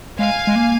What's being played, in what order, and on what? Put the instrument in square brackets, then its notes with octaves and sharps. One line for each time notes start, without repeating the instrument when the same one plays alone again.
[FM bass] G#3 [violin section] F5 G#5
[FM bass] G#3
A#3